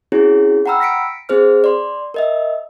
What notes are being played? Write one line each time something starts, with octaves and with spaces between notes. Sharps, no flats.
C4 C#4 E4 F#4 G#4 C#5
F#5 G5 A#5 B5 E6 F6
A#6 B6 C#7 D7
C4 G#4 C5 F6
D5 C6
A#4 D#5 E5